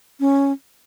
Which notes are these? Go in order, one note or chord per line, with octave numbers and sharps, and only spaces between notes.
C#4